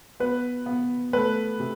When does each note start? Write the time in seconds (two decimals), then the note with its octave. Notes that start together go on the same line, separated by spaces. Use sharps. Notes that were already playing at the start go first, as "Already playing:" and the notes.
0.20 B3 B4
0.66 B3
1.13 A3 B4
1.60 C3